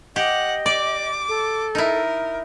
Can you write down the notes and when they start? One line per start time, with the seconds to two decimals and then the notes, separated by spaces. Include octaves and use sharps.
0.16 G4 D#5 F#5
0.66 D5 D6
1.29 A4
1.75 D#4 E4 A#4